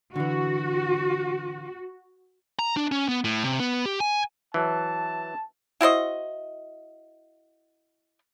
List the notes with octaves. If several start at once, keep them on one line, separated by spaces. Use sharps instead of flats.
D3 E3 F#4
A#5
D4
C#4
B3
A2
C3
B3
G4
G#5
E3 F#3 A5
E4 F#4 C5 D#5